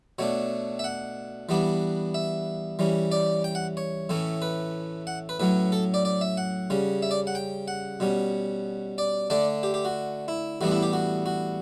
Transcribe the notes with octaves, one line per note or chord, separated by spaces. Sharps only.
B2 A3 D4 C#5
E5
F#5
E3 G3 B3 D4
E5
E3 G3 C#4
D5
G5
F#5
C#5
A2 E3 A3 C#4
B4
F#5
B4
A2 F#3 C#4 B4
A4
D5
D5
E5
F#5
C#3 G3 C#4
E5
D5
F#5
G5
F#5
B2 G3 C#4
D5
D3 A3 D4 D5
G4
G4
F#4
E4
A2 E3 G3 B3 D4 F#4
E4
G4
F#4
F#4